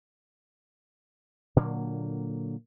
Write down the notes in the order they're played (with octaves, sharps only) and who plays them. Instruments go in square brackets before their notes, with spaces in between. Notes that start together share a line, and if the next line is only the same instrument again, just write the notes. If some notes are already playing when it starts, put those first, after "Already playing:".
[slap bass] A#2 D3 F#3 A#3